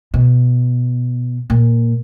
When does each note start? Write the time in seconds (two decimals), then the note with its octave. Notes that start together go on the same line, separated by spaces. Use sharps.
0.14 B2
1.50 A#2